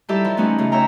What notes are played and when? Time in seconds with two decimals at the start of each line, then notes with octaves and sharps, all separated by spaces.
0.09 G3 D#4 E4 G4 A4 E5
0.25 F3
0.37 E3 A3 B3 C#4 D#4 F#4
0.58 C#3 A3 F4
0.72 C#5 E5 G5 A#5